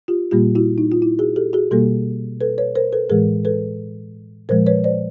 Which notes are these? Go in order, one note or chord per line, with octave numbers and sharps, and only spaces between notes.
F4 G4
A#2 G3 A#3 F4 G4
E4 F#4
D#4
F4
E4
F#4 G#4
G4 A4
F#4 G#4
B2 G3 A#3 G4 A4
A4 B4
B4 C#5
A#4 C5
A4 B4
A2 E3 G#3 G#4 A#4
A4 B4
A#2 F3 G#3 A#4 C5
B4 C#5
C5 D5